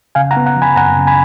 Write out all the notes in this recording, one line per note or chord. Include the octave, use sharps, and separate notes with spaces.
C#3 F5 G#5
F#5 A#5
B3
F#5 A#5
F3
G#5 B5
F#2 F#5 A#5
C#3
G#5 B5